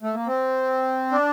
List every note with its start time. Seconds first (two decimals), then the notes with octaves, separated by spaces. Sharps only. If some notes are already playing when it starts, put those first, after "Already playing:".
0.03 A3
0.15 A#3
0.27 C4
1.12 D4